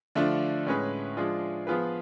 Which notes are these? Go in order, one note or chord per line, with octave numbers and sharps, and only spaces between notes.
D3 F3 A3 D4 F4
A2 G#3 C#4 G#4 B4
F3 G#3 D4 F4 G#4
F3 B3 F4 G#4 B4